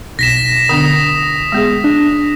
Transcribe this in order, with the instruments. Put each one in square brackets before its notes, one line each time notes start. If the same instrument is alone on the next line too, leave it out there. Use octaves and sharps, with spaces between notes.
[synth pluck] B1 [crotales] A#6 B6 E7
[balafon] D3 B3 D4 [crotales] D#6
[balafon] G#3 B3 G#4
[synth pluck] D4